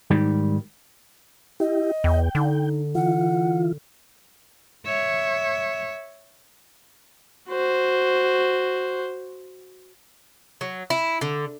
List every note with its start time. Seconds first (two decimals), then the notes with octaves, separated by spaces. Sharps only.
0.11 G#2 D#3 G3
1.60 E4 G4 D#5
2.04 E2 G5
2.35 D3 D#4
2.95 E3 F4 F#5
4.87 C#5 E5
7.49 F#4 C5
10.61 F#3
10.90 E4
11.21 D3